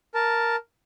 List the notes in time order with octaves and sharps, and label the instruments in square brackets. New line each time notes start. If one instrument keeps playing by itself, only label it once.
[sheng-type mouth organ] A#4 A5